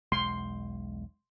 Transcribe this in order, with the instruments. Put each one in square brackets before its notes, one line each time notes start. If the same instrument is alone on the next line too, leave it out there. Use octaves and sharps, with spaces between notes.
[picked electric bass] E1 B1 G#3 [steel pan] C6